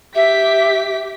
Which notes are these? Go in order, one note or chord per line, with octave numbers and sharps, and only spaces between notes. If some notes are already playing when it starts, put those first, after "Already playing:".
G4 E5 B6